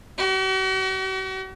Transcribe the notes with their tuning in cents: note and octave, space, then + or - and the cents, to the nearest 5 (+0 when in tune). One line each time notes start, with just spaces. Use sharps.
F#4 +45